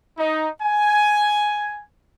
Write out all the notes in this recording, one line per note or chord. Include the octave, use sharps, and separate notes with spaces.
D#4
G#5